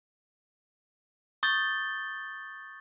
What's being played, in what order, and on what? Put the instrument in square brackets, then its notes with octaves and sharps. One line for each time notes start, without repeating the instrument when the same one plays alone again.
[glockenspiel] C#6 D#6 G6 A6 G7